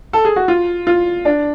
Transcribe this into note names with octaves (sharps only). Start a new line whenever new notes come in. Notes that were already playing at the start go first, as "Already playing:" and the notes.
A4
G#4
F#4
F4
F4
D4